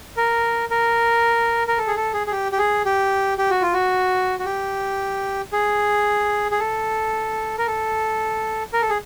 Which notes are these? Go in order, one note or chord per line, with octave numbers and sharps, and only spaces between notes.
A#4
A#4
A#4
A4
G#4
A4
G#4
G#4
G4
G4
G#4
G4
G4
F#4
F4
F#4
F#4
G4
G#4
G#4
A4
A#4
A4
A#4
A4
G#4